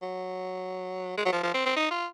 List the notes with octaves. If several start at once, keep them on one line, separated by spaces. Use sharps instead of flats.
F#3
G#3
F#3
F3
F3
C4
C4
D#4
F4